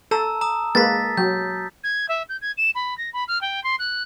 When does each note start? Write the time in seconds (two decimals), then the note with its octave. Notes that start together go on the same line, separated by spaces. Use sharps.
0.11 A4 A5 A#5 E6
0.41 A#5 D#6
0.75 G#3 A#3 B4 A6 B6
1.17 F#3 G6
1.84 G#6
2.09 E5
2.29 G6
2.41 G#6
2.57 E7
2.75 B5
2.98 A#6
3.13 B5
3.28 F6
3.41 G5
3.64 C6
3.79 F#6